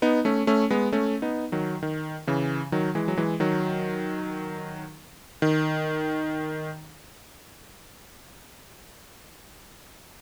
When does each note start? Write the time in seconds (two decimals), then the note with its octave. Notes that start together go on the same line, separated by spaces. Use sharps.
0.02 B3 D#4
0.25 A3 C#4
0.47 A3 C#4
0.70 G#3 B3
0.93 A3 C#4
1.22 B3 D#4
1.52 D#3 F#3
1.83 D#3
2.27 C#3 E3
2.72 D#3 F#3
2.95 E3 G#3
3.08 F#3
3.17 E3 G#3
3.40 D#3 F#3
5.42 D#3